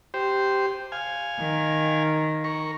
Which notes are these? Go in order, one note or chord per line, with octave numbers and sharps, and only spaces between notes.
G4 C5
F5 G#5
D#3
A#4 C#6